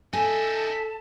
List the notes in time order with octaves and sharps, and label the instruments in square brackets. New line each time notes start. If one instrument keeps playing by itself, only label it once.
[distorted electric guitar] D#4 E5 [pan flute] A4 [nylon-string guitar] G#5 [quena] A5